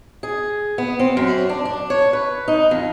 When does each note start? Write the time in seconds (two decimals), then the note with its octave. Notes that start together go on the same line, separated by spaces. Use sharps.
0.23 G#4
0.78 B3
0.99 C4
1.17 F#2
1.49 D4
1.65 D4
1.90 C#5
2.13 B4
2.48 D#4
2.71 F2